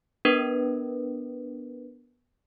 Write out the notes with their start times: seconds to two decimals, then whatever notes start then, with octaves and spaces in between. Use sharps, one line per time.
0.25 B3 D4 A#4 B4